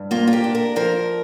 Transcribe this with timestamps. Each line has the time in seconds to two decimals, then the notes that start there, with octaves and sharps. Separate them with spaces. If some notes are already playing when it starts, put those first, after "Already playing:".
Already playing: G2
0.11 A#3 F4
0.27 F4
0.33 G4
0.44 D4
0.55 A#4
0.76 F3 A#4